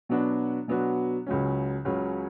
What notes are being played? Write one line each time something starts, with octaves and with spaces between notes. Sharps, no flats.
B2 F#3 B3 D4 F#4
B2 F#3 B3 D4 F#4
C#2 C#3 F#3 C#4
C#2 C#3 F#3 C#4